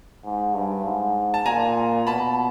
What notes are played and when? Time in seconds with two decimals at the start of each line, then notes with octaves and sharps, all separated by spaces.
0.24 G#2
0.54 G2
0.85 G#2
1.34 A5
1.46 A#2 G#5 A#5
2.07 B2 A5 B5